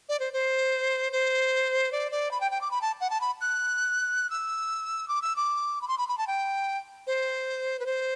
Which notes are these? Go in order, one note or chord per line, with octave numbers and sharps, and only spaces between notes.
D5
C5
C5
C5
D5
D5
B5
G5
G5
D6
B5
A5
F#5
A5
B5
F#6
E6
D6
E6
D6
B5
C6
B5
B5
A5
G5
C5
B4
C5